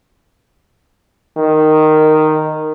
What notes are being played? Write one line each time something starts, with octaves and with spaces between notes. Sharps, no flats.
D#3